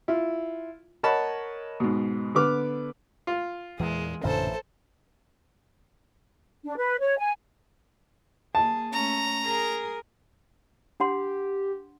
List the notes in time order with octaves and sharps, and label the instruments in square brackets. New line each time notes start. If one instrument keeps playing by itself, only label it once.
[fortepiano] E4 F4
A#4 C#5 D#5 F#5 A5 B5
G#2 B2
D3 B3 B4 D6 F6
F4
[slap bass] E2 A#2 [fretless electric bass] E3 [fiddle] G#3
[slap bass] A1 [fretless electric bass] F#2 A#2 D3 [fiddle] A4 C5
[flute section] D4
B4
C#5
G#5
[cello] A#3 G#4 [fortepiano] A5
[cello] A3 C#4 [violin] A#5
[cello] G#4 A#4
[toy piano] D4 F#5 C6 [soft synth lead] G4